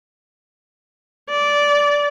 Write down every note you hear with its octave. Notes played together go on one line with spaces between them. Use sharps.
D5